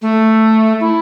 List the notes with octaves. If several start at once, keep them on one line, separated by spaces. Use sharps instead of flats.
A3
E4